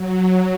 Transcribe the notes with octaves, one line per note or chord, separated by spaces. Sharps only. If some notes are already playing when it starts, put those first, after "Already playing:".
Already playing: F#3